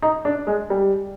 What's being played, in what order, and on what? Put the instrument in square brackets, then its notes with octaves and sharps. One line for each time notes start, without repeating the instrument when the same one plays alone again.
[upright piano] D#4
D4
G#3
G3